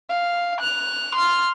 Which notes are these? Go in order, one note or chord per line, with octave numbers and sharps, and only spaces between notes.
F5
F#6 F7
C6 F6